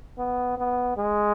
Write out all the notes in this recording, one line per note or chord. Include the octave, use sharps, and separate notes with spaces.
B3
B3
G#3